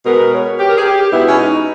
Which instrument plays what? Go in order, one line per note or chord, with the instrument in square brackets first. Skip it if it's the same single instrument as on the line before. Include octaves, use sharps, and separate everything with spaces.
[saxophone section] B2 G#3 B3 A#4
C#5
G4
A#4
G#4
G4
B2 G#3 B3 E4
C#4
D#4